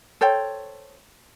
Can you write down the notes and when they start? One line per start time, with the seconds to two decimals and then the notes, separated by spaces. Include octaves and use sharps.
0.21 A4 C5 C#5 G5